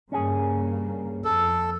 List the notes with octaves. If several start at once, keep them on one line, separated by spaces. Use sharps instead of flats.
G2 C#3 A#3 C#4 G#4
F2 A4